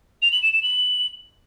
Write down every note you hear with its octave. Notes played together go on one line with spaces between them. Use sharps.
F7
F#7
E7
E7
F#7